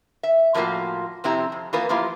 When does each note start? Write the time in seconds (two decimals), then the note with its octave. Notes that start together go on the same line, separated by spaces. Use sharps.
0.23 E5
0.54 A2 F3 A3 A#3 F4 F#4
1.24 F2 C3 C4 E4 G4 A#5
1.52 F2
1.73 E3 A#3 B3 F4 B4
1.89 F3 A#3 E4 F4 G4